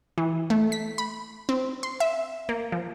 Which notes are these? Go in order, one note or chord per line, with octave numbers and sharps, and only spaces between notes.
E3
A3
B6
B5
C4
C6
E5
A#3
F3